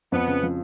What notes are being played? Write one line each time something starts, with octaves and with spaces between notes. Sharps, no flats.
F2 B3
C#3
F3